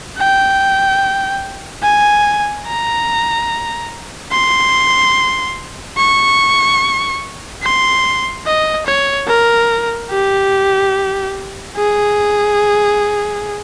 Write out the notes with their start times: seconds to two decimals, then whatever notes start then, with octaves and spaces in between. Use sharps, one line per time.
0.18 G5
1.83 G#5
2.67 A#5
4.32 C6
5.97 C#6
7.63 C6
8.46 D#5
8.86 C#5
9.28 A#4
10.11 G4
11.77 G#4